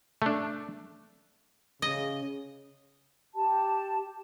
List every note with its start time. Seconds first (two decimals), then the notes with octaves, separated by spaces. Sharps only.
0.22 A3 D4
1.82 C#3 D#5
3.35 G4 A5